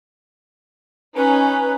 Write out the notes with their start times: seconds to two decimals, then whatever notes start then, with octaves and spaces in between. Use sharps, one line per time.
1.17 C#4 D#4 B4